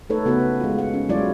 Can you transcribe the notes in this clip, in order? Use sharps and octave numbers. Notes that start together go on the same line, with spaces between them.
A3 D#4 A4 B4 C#5
C#3 B3 F#4 B4
G#3 F4
F#5
C#4
F#3 G#3 E4 F4 C#5 D5